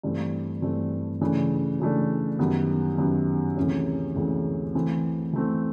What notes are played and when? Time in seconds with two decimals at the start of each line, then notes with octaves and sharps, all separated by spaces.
0.03 G2 E3 A3 C4
0.62 G2 E3 A3 C4
1.21 C#3 E3 A3 D4
1.80 C#3 E3 A3 D4
2.39 F#2 D#3 G3 B3
2.98 F#2 D#3 G3 B3
3.57 D2 C3 E3 G#3 C#4
4.16 D2 C3 E3 G#3 C#4
4.75 E3 A3 C4
5.33 E3 A3 C4